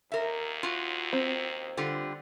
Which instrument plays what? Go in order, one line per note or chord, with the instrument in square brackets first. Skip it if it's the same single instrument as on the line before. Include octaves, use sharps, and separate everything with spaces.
[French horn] D#2 [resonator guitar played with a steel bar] A#4 E5
[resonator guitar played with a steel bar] F4 F#4
[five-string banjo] C4
[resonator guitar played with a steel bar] D3 G3 F4